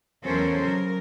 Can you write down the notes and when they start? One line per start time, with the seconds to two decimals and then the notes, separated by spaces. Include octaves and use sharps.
0.24 E2 F#3 C#4 A4 A#4 C5
0.62 C#3 F#3 A#4